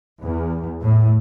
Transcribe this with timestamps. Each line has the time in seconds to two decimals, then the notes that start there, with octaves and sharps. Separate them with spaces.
0.24 E2
0.84 A2